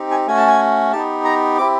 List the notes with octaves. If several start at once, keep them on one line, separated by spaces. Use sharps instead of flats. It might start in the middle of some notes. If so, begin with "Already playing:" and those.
Already playing: C4 D#4 G4
G#5
A3 C#4 F#4 G#5
A5
G#5
B3 D#4 G4 A5
A#5
C4 E4 G4 D6